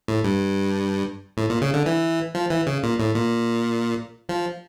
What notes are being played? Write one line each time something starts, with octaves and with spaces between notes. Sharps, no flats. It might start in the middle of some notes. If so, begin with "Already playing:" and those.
A2
G2
A2
A#2
C#3
D3
E3
F3
E3
C#3
A#2
A2
A#2
F3